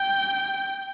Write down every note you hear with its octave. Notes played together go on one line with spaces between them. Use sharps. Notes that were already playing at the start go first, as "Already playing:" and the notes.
Already playing: G5